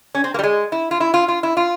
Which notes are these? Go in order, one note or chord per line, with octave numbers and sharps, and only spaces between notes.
C#4
C4
A#3
G3
G#3
E4
F4
E4
F4
F4
E4
F4